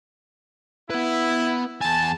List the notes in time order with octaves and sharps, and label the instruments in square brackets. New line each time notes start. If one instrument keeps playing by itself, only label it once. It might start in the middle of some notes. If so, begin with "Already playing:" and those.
[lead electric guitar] B3 B4 [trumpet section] E4
[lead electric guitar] E2 G#5 [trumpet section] A5